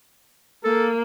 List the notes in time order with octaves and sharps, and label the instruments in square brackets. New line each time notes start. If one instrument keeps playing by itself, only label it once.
[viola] A#3 [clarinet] A4